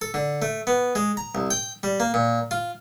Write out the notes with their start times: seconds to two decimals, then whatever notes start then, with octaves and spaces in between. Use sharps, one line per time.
0.01 A4
0.14 D3
0.42 A3
0.67 B3
0.95 G#3
1.17 A#5
1.35 C2
1.50 G5
1.83 G3
2.00 A#3
2.14 A#2
2.51 F4